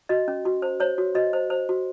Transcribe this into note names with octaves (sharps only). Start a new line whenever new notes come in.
F#4 D#5
C#4
F#4
C5
C5 C#5
F#4
F#4 D#5
C5
C5
F#4